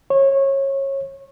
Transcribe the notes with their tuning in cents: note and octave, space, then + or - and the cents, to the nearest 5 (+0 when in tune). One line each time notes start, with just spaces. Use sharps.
C#5 -25